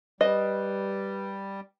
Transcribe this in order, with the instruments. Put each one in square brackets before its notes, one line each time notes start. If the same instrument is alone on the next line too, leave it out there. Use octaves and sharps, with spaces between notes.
[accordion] G3 [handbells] B4 [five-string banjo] D#5